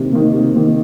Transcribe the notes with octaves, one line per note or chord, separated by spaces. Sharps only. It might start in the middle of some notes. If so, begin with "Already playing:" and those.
Already playing: C3 D#3 A#3
D#3 A#3
C3
D#3 A#3